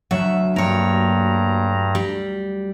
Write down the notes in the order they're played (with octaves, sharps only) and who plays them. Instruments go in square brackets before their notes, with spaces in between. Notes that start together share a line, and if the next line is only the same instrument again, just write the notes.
[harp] D2 F#3 F#5 [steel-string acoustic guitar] E5
[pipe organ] G2 A#5 [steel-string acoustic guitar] A#3 C#5
[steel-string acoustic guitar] G3